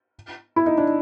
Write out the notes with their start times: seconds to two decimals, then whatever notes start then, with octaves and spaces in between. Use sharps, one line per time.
0.56 E4
0.66 D#4
0.78 D4